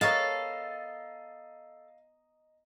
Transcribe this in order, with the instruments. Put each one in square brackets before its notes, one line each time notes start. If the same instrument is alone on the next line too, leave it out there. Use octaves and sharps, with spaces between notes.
[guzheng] B3 A#4 C#5 [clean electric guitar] A4 A5 [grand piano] D#5 A#5 [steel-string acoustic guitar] F5